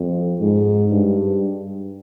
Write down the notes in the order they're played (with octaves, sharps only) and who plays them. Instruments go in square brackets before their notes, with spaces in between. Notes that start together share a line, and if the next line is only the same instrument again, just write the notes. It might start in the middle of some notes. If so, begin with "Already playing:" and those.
Already playing: [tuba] F2
G#2
G2